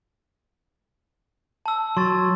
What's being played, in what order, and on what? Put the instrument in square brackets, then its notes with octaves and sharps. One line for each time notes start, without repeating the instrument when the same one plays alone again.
[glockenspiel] A5 E6
[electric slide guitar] F#3 [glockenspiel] C6 C#6 A6